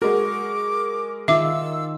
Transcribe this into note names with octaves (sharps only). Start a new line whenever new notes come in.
G#3 F#4 A#4 D6
D#3 D#4 F4 E5 D6 E6